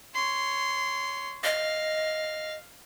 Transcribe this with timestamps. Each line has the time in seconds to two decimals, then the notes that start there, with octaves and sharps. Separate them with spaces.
0.15 C#5 C6
1.44 D#5 F5